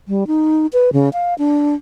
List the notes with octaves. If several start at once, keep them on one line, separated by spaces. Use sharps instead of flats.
G3
D#4
B4
C#3
F5
D4